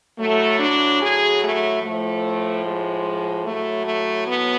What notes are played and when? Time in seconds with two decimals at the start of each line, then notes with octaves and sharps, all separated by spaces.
0.18 A2 F#3 A3
0.59 D4
1.01 G#4
1.42 A3
1.82 A2 F3 A3
2.65 G#3
3.45 A2 F#3 A3
3.86 A3
4.28 B3